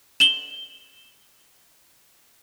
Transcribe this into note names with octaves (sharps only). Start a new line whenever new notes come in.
E7 F#7 G7